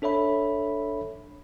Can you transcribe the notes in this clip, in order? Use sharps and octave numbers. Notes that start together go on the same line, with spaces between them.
D4 A4 C#5 E5 B5